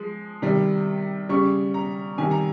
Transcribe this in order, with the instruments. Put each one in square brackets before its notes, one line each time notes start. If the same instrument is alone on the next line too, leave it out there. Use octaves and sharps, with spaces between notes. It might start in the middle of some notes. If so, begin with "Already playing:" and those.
Already playing: [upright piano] F3 G#3
C3 D#3 G3
C#3 G3 C#6
A#5
C3 D#3 G3 G#5
A#5